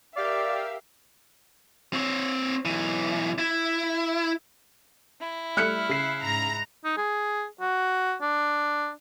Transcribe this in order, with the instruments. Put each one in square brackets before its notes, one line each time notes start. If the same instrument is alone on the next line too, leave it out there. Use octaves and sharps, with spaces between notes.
[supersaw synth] G4 F5 [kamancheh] A#4 E5 [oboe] D5
[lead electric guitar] C4 C#5
B1 E3
E4
[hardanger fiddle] E4
[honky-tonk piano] G3 A3 [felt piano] F6 F#6 C#7
[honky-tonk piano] C#3 C7 E7
[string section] G#2 A#5
[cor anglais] D#4
G#4
F#4
D4